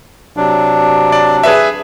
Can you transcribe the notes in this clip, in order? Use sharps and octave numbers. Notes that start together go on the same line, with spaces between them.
C3 F#3 D4
D5
G#4 B4 E5